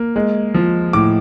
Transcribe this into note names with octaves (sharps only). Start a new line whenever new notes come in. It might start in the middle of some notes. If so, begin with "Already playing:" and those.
Already playing: A#3
G#3
F3
A2 D6